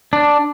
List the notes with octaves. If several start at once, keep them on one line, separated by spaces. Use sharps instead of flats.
D4